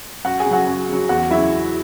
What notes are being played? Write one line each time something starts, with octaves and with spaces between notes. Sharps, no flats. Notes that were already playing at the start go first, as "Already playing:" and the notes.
F#2 F#4 F#5
G#4 G#5
C#3
F#3 F#4 F#5
F#2
C#3 F#3
E2 F#4 F#5
C#3 F#3 E4 E5